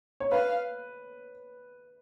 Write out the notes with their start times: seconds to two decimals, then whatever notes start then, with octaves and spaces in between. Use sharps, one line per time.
0.20 C#5
0.32 B4 F5